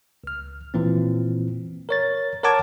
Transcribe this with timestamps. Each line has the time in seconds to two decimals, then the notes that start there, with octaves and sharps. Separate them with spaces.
0.24 C#2 F6
0.74 A#2 E3 C4
1.89 A#4 C#5 A6
2.43 A#4 C#5 F#5 A5 D6 G#6